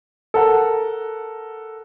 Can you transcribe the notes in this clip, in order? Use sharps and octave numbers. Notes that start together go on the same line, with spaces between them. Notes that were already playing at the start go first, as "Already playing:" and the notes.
A4 A#4 F#5